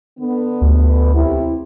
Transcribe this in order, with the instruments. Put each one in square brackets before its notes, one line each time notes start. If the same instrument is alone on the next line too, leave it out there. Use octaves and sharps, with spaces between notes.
[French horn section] D3 B3
[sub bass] D2
[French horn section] C3 E4